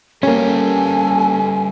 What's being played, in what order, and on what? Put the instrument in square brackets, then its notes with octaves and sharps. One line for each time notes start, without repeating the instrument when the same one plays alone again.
[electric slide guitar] G3 B3 G4 [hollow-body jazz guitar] A#3 C#4 [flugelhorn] A4 [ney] G#5